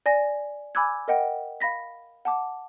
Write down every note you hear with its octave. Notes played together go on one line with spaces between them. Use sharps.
D5 G#5 A#6
G#5 B5 D6 E6 F#6 G#6
A#4 D#5 F#5 G5
F5 B5 A#6 B6
F#5 A5 D6